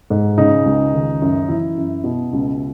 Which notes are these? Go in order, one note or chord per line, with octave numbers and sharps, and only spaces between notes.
G#2
C#3 D#4
C#2
D#3
F#2
E3 E4
F#2
B2
C#2